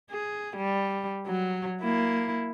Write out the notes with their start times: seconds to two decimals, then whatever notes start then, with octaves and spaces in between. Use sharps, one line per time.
0.10 G#4
0.57 G3
1.27 F#3
1.82 A#3 E4